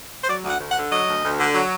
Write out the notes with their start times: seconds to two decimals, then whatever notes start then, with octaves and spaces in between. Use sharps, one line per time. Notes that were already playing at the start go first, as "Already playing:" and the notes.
0.24 C5
0.28 F#3 D5
0.44 D2
0.50 F#5
0.60 D2
0.70 F#5
0.76 D3
0.92 F#3 D#5
1.08 D2
1.24 D2
1.39 D3
1.55 F#3